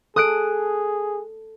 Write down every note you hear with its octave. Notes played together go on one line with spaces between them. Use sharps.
G#4 A4 D#6 F#6 D7